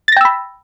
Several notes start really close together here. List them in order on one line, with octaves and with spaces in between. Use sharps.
A6 A#6 G5 E6 B5